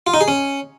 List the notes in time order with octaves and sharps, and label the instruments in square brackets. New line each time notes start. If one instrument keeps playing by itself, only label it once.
[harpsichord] F4
D#4
G#4
C#4